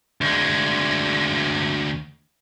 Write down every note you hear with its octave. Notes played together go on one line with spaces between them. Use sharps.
D2 G#3